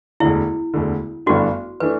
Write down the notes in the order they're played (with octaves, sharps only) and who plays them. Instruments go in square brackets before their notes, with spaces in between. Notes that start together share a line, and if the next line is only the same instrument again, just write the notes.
[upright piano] E1 D2 D3 [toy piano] E4
[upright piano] E1 D2 D3
[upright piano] G1 G2 E3 A3 D4 [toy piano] F#4
[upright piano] E3 A3 D4 [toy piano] B4